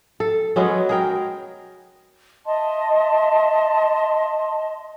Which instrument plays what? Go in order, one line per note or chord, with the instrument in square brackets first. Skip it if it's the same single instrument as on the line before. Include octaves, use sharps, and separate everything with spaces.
[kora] A4
F#3 G#3 B3 C#4
G#4 A#4 G5
[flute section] D#5 E5 A5 C6